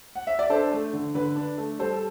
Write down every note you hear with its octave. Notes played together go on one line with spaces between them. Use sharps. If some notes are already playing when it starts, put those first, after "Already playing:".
F#5
E5
D5
D4 A4 C5
A3
D3
D3 B4
D4
A3
G3 A4 C5
A4